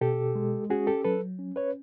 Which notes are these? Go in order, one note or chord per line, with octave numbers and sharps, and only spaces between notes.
B2 G4 A4
G#3
C#4 F#4 G#4
G4 A4
F#3 A4 B4
C#4
B4 C#5